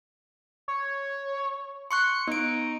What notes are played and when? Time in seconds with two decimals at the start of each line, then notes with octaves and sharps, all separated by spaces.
0.68 C#5
1.91 C6 C#6 F#6 C#7
2.28 B3 D#4 D7